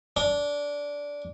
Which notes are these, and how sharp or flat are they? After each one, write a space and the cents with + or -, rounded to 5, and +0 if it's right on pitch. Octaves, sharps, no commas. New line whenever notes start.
D4 -15